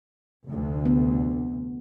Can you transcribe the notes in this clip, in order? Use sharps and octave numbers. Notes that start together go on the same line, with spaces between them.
F1 D2
B3